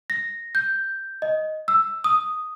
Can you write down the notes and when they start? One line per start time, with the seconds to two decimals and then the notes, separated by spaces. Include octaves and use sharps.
0.10 A#6
0.55 G6
1.22 D#5
1.68 E6
2.04 D#6